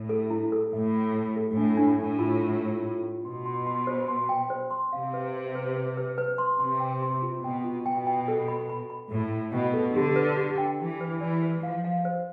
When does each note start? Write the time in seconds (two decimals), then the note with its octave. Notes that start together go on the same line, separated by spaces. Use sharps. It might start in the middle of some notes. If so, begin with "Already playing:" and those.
Already playing: A2
0.09 A4
0.30 E4
0.52 A4
0.73 A2 E5
0.94 E5
1.15 A4
1.36 A4
1.57 A2 D4
1.77 D4
1.99 A2 D4
2.19 F4
2.41 F4
2.61 F4
2.83 F4
3.04 F4
3.25 B2 C6
3.46 C6
3.66 C6
3.87 C5
4.08 C6
4.29 G5
4.50 C5
4.71 C6
4.92 C3 F5
5.14 B4
5.34 B4
5.55 B4
5.76 B4
5.97 B4
6.18 B4
6.38 C6
6.60 C3 C6
6.80 G5
7.02 C6
7.22 F4
7.43 B2 G5
7.64 F4
7.85 B2 G5
8.07 G5
8.28 A4
8.48 B5
8.69 B5
8.90 B5
9.11 A2 A4
9.33 B5
9.53 B2 G5
9.74 A4
9.96 D3 G4
10.16 B4
10.37 G4
10.58 G5
10.79 E3 G4
11.01 B4
11.21 E3 D5
11.43 B4
11.63 F3 F5
11.85 F5
12.05 C5